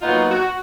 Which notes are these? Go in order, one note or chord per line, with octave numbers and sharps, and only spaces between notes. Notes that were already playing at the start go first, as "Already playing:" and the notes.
A#2 F#3 B3 D#4 F4
F#4